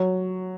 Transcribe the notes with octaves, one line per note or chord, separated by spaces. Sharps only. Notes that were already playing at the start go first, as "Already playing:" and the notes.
Already playing: F#3